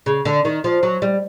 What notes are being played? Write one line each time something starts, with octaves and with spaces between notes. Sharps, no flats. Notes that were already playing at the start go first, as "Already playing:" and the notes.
C#3
D3
D#3
F3
F#3
G3